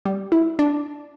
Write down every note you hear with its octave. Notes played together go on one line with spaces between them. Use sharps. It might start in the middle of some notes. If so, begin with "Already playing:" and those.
G3
E4
D4